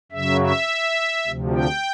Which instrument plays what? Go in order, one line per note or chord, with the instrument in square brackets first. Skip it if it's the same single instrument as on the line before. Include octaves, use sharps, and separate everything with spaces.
[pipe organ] F#2 C#3 F#3 E5
E5
D2 C3 F3
G5